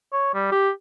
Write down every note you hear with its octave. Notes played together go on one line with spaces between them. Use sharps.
C#5
G3
G4